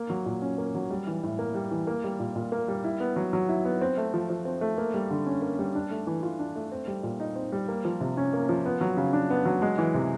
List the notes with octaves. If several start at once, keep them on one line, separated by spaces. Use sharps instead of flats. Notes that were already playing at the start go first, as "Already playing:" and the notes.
Already playing: A#3
F#3
A#2
C#4
A#3
F#3
G3
E3
A2
A#3
G3
E3
A#3
G3
A#2
A#2
A#3
G3
E4
B3
F#3
F#3
E4
B3
C4
A3
F3
F3
C4
A3
A#3
G3
D3
C#4
A#3
G3
D4
A3
E3
F4
D4
A3
C4
G3
A#2
D#4
C4
G3
A#3
F3
C3
C#4
A#3
F3
B3
F#3
C#3
D4
B3
F#3
G#3
E3
C3